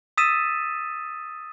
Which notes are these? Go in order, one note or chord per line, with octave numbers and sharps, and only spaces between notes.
D#6 E6 A6 B6 D#7 E7